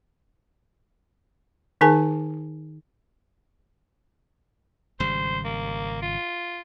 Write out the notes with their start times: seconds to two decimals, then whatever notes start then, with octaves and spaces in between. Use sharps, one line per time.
1.81 D#3 D#4 G#4 A#4 G#5 A5
5.00 G#1 C#3 G3 C5
5.45 A#3
6.02 F4